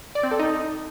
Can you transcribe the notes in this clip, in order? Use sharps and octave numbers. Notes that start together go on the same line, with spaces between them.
D5
C4
A4
D#4